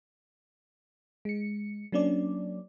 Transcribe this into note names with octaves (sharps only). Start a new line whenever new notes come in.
G#3 C#7
F#3 A#3 C#4 D4 D5